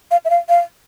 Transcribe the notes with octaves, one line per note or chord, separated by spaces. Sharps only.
F5
E5
F5
F5